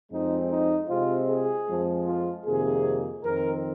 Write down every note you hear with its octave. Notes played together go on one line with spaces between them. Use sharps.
F2 F3 G#3 C4 D#4
D#4
C3 G#3 C4 F4
G#4
F2 F3 G#3 C4
F4
F2 C3 D#3 A#3 G#4
F2 D#3 C4 A#4